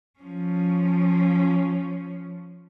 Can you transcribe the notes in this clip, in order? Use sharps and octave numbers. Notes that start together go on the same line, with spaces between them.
F3 C#4